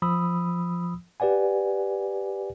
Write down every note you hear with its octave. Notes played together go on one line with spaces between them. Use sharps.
F3 B5 D#6 E6
G4 B4 D5 F#5 G#5